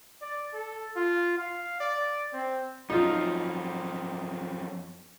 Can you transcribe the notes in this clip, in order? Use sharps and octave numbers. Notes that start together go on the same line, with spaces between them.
D5
A4
F4
F5
D5
C4
F#2 F3 D#4 F4